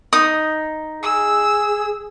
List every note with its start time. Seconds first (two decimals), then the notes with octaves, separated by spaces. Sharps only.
0.13 D#4 D#6
1.03 G#4 E6